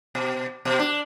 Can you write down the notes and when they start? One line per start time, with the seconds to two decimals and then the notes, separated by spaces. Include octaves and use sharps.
0.15 B2
0.65 B2
0.79 D4